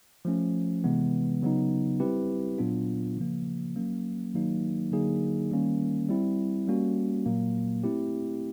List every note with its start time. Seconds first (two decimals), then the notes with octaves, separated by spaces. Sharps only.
0.25 F3 A3 C#4
0.84 C3 E3 G#3 B3
1.42 C#3 F#3 B3 D#4
2.00 G3 C4 E4 G4 B4
2.58 A#2 F#3 B3 D4 F4
3.17 C#3 F3 A#3
3.76 F#3 A#3 C#4
4.34 D#3 F#3 A#3 D#4
4.92 D3 F#3 A#3 D#4 G#4
5.51 D#3 G3 A#3 C#4
6.09 G3 C4 E4
6.67 G3 A#3 C#4 F#4
7.26 A#2 F#3 A#3
7.84 A3 C4 E4 G4